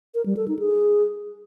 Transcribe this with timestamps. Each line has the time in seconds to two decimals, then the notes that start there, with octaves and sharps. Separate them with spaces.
0.15 A#4
0.26 G3
0.37 A4
0.48 D#4
0.59 G#4